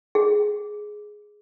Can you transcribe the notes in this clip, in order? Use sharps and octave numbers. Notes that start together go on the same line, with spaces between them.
G#4